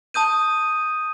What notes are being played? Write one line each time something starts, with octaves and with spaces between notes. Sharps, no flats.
A5 D#6 G6 D#7